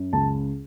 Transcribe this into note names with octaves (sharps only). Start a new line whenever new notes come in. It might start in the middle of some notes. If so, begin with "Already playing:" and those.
Already playing: F#2
C#2 A5